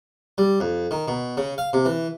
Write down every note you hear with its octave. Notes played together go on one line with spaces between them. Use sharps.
G3
F2
D#3
B2
C#3
F5
C3
E3